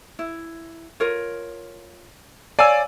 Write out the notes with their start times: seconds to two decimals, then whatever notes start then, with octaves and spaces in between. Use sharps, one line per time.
0.19 E4
1.00 F4 A#4 C#5
2.59 C#5 D5 F5 G#5 E6